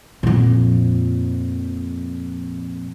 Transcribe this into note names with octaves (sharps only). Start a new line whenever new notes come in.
F2 A#2